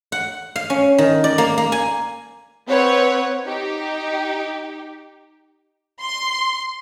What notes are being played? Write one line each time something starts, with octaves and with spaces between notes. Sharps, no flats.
F#5
F5
C#4
D#3
D5
A#3
A#3
G#5
C4 B4 C#5 F#5
D#4 G4
C6